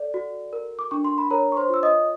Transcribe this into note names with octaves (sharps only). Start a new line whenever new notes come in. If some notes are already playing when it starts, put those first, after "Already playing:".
Already playing: A4 D5
F#4
A#4
D6
D4 C#6
C6
B5
A#4 C#5 A#5
C#6
C5 C6
F4 E6
D#5 D#6